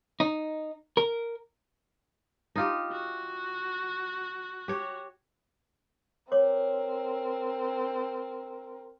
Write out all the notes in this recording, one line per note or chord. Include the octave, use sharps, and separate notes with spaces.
D#4
A#4
D#4 F4 G4
F#4
G4 C#5
C4 A#4 C#5 D6